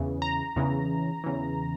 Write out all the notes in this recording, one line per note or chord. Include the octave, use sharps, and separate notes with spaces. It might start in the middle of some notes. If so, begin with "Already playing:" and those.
Already playing: E2 C#3 E3
A#5
E2 C#3 E3
E2 C#3 E3